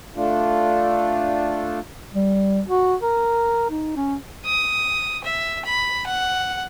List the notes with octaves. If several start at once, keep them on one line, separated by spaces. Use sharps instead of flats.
A3 D4 F4
G3
F#4
A#4
D#4
C#4
D#6
E5
B5
F#5